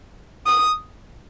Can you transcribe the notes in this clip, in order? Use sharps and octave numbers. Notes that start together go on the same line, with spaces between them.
D#6